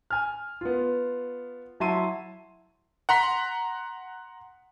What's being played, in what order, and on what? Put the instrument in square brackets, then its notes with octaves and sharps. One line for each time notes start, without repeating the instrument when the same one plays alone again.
[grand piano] G#5 F6
B3 F4
F#3 E4 E5 A5 C6 D#7
[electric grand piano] F#5 A#5 C6 B6